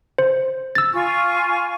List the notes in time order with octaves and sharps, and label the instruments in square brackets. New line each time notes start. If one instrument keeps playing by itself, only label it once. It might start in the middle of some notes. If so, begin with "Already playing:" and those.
[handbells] C5
E6 A6
[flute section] F4 G#5 C#6